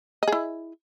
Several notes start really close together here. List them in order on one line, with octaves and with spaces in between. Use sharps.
D#5 G#4 E4